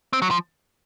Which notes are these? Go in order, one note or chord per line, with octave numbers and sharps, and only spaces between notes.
C4
F#3
F3